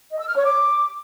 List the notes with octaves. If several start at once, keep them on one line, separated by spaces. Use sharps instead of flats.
D#5
E6
F6
C#5
D6